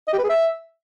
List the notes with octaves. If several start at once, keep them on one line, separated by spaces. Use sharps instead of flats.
D#5
G4
B4
G#4
E5